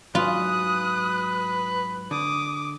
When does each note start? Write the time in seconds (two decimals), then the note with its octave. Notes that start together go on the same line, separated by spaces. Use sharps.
0.15 G#2 F#3 F4 B4 D#6 F#6
2.11 D3 D6 D#6